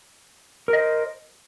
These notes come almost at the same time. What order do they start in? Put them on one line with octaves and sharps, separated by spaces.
A#4 D#5 C5